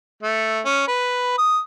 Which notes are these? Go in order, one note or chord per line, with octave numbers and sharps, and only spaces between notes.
A3
C#4
B4
D#6